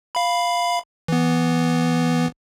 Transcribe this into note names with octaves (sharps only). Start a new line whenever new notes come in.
F5 B5
E3 B3